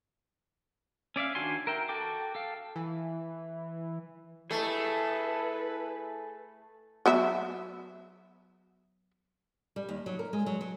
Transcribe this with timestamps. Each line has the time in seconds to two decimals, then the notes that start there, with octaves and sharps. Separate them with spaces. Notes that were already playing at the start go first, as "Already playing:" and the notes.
1.16 C#4 D5 E5 F5
1.35 D#3 D4 F#4 G#5 C6
1.67 A#4 E5 G5
1.89 F#4 A4 G5 D6
2.35 A4 F5
2.76 E3
4.51 A3 E4 G#4 A4 B4
7.06 F#3 B3 E5
9.76 G3
9.89 D#2
10.06 F#3
10.19 A#4
10.33 G#3
10.46 F#3
10.61 F#3